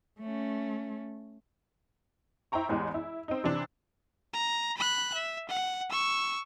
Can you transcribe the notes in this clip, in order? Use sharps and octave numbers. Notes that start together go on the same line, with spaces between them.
A3 C#4
E4 C5 G5 A#5 C#6
A1 E2 E3 G#3 G4
E4
C4 D#4
C3 E3 C4 D4
A#5
B5 F#6
E5
F#5
C#6 E6